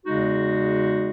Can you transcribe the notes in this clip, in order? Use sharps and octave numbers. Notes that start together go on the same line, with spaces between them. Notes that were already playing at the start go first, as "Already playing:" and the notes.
E2 C#3 G#3 D#4 F#4